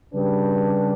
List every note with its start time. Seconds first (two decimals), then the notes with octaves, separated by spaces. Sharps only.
0.12 C#3 G3 D4 G4 B4